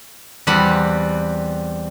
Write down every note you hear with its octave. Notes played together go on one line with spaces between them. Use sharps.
E2 G3 C4 F#5 B5